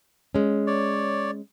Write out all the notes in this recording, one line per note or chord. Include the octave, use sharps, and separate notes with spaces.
G#3 C#4
C#5 D5